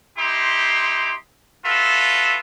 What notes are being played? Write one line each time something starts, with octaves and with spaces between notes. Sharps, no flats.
D#4 E4 G4 C6
F4 F#4 A4 B4 E5